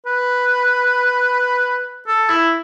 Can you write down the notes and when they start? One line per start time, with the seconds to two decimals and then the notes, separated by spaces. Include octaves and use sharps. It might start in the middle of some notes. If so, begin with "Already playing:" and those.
0.06 B4
2.07 A4
2.30 E4